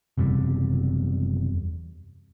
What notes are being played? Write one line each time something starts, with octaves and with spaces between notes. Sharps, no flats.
F#1 E2 C3 G3